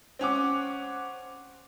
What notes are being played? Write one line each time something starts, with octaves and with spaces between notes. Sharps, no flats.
C4 C#4 F#5 D6